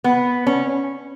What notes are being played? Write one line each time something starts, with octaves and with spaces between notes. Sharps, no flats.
B3
C#4